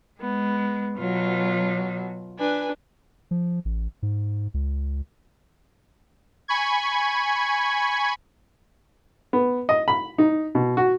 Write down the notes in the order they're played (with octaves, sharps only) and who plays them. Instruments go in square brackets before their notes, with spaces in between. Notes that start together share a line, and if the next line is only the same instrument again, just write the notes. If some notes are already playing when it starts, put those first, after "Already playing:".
[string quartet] G#3 [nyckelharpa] B3
[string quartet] B2 F#3 [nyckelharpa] F4
[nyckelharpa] D4 [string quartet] B4 G#5
[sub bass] F3
A1
G#2
C#2
[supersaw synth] G#5 B5 C#6 G#6
[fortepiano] B3
D#5
B5
D#4
B2
F#4